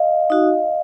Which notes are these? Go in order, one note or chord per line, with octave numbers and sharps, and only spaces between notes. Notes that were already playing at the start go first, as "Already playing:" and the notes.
Already playing: D#5 F5
D#4 F#4